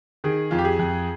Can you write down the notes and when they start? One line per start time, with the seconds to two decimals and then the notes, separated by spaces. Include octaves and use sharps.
0.24 D#3 G#4
0.51 F2 F4
0.58 G4
0.65 G#4
0.79 F2